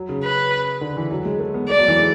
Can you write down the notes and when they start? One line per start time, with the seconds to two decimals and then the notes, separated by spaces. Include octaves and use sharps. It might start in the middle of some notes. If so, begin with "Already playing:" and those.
Already playing: F#3
0.09 C#3
0.23 B4
0.81 D3
0.97 E3
1.11 F#3
1.25 G#3
1.39 A3
1.54 B3
1.69 A3 D5
1.79 F#3
1.88 E3
1.98 G#3